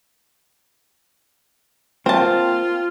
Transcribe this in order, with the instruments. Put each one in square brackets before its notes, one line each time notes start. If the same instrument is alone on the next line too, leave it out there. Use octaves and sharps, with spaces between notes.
[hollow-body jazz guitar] A#3 C4 [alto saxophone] F4 [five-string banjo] C5 A5